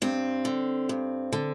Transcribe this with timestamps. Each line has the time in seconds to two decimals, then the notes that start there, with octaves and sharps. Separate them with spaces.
0.02 G2 C4
0.45 D3
0.89 G2
1.33 D3